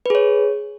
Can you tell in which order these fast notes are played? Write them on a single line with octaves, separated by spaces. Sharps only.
B4 G#4 C#5